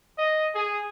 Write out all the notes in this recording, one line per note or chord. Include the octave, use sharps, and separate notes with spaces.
D#5
G#4